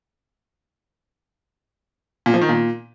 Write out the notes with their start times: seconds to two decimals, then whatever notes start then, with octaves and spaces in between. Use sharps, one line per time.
2.26 A#2
2.34 F3
2.41 D#3
2.49 A#2